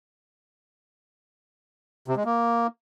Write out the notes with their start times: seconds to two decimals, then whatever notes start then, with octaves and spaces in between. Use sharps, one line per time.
2.08 C3
2.16 G#3
2.25 A#3